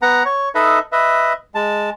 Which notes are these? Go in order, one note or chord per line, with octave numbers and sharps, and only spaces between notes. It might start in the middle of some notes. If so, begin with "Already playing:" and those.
B3 F#5 A#5
C#5
D#4 A4 B4 D#5 E5
B4 D#5 E5
G#3 A5